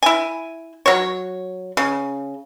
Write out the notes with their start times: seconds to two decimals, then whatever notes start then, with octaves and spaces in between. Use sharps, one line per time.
0.03 E4 G#5
0.86 F#3 C#5
1.77 C#3